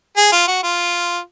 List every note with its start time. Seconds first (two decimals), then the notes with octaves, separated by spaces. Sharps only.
0.17 G#4
0.32 F4
0.47 F#4
0.63 F4